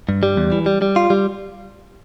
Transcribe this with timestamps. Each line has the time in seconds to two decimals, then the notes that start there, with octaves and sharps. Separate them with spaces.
0.09 G2
0.23 G3
0.37 E2
0.52 E3
0.66 G3
0.82 G3
0.96 F4
1.10 G3